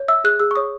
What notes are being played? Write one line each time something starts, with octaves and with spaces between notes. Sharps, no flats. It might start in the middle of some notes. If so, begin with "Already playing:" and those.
Already playing: C#5
E5 E6
G#4 F#6
G#4 E6
C#6
C#5 D#6